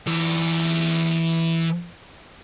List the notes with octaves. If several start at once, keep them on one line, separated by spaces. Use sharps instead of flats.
E3 D5